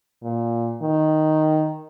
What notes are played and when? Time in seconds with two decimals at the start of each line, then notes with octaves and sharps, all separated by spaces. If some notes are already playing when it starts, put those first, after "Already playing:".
0.23 A#2
0.82 D#3